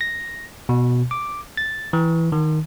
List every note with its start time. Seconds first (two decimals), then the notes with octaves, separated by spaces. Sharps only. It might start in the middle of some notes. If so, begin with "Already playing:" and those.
0.01 A#6
0.69 B2
1.11 D6
1.57 A6
1.93 E3
2.32 D#3